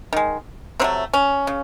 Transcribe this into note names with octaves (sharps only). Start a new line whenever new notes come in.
D#3 G#3
C3 F#3 A3 C4
C#4
C#3